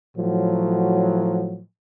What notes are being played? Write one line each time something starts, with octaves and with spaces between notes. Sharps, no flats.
A2 F3 F#3